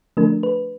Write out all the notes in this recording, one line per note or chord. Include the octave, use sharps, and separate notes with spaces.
D3 F3 A3 D4 A#4
B4